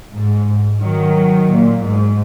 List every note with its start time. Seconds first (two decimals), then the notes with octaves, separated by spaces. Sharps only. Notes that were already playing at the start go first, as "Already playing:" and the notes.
0.14 G#2
0.81 D#3 F#3
1.48 A#2
1.81 G#2